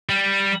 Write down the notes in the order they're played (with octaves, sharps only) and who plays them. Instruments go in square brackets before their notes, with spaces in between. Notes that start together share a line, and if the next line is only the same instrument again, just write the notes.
[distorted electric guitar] G3